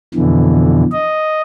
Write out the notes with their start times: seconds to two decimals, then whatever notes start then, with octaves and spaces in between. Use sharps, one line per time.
0.14 F2 B2 D3 E3
0.92 D#5